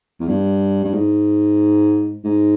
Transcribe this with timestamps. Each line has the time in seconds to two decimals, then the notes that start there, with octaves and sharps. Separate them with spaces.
0.20 E2
0.28 G2
0.85 G2
0.94 G#2
2.24 G#2